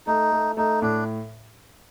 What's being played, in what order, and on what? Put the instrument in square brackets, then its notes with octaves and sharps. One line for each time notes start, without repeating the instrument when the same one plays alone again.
[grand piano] A3 [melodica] D#4
[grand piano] A3
[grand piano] A3 [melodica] D#4
[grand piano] A2 [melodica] D4